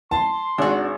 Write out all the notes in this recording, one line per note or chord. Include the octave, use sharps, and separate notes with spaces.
A5 C6
G#1 D4 F#4